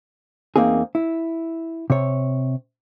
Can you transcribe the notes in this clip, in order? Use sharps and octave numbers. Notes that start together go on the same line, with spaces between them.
E2 G#2 A#3 C4 D#4 G#4
E4
C3 C#5